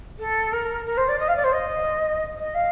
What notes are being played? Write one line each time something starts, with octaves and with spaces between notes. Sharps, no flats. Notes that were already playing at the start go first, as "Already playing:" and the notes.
A4
A#4
A#4
C5
D5
D#5
F5
D5
C5
D#5
D#5
F5